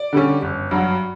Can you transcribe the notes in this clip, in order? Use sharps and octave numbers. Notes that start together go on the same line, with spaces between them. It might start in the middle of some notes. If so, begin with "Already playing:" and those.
Already playing: D5
D3 G3 C#4
G1
G2 F#3